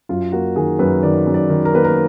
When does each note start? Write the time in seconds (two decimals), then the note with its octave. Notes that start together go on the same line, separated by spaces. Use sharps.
0.09 F#2 F4
0.32 A#3 F#4
0.56 D#3 G#4
0.79 F#2 B4
1.03 D#3 D5
1.26 F#2
1.34 D5
1.50 D#3
1.65 A#4
1.73 A#3 B4
1.84 A#4